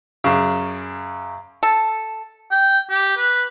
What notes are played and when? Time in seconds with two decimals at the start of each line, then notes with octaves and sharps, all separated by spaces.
0.24 F#2 C#3
1.63 A4
2.51 G5
2.90 G4
3.17 B4